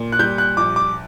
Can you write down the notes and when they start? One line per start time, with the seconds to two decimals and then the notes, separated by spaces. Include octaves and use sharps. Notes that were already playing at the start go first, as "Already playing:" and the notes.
Already playing: A#2
0.12 F#6
0.19 G3 G6
0.38 F#6
0.57 A#1 D6
0.76 D6